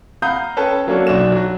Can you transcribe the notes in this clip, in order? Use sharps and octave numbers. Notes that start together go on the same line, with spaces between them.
F5 F#5 A#5 B5 D#6 G6
C#4 A4 B4 G5 A5 B5
F#3 A#3 C#4 D4 F#4 A4
B1 D4 F#4 E7
F#3 F#4